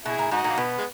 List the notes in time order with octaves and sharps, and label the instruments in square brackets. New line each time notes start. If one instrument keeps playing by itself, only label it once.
[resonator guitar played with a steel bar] B2 [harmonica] E4 G#4
[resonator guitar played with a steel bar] A#2
[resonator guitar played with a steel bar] G#2 [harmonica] D#4 F#4
[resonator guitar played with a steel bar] A#2
[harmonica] A#3
[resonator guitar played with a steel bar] B2 [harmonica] B3
[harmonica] G#3